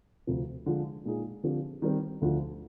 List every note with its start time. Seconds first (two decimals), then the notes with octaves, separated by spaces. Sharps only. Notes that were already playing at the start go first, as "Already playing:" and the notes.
0.27 D2 C3 F3 C4
0.66 D3 F3 G#3
1.05 A#2 G#3 D#4 G#4
1.44 D3 F3 C4 G4
1.82 D#3 G3 C4
2.21 D2 D3 F3